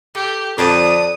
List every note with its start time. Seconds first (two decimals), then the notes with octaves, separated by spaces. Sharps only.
0.15 G4 A4
0.58 F2 D3 D5 A5 D#6